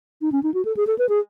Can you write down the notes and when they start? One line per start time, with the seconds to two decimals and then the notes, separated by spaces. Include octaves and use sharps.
0.22 D#4
0.32 C#4
0.43 D#4
0.54 F#4
0.65 A4
0.77 G#4
0.87 A4
0.99 B4
1.09 G#4